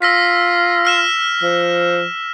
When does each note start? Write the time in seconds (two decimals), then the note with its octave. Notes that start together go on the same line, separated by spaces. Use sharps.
0.02 F4 E6 A#6 B6
0.85 E6 F6 E7
1.43 F3